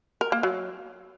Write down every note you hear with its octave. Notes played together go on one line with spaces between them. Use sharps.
A#4
A#3
F#3